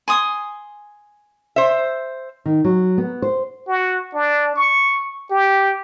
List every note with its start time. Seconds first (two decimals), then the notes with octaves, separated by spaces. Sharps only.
0.08 G#5 C6 D#6
1.56 C5 E5
2.46 D#3
2.65 F#3
2.98 B3
3.22 C5
3.68 F#4
4.14 D4
4.56 C#6
5.31 G4